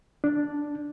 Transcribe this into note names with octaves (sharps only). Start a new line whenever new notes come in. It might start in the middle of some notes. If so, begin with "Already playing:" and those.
D4